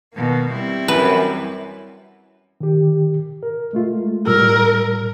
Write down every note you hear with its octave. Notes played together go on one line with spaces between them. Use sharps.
B2 D#3 A#3
G3 C4 E4
F#2 E3 B4
D#3 G4
A#4
G#3 A3 F4
A2 G3 A#4 E6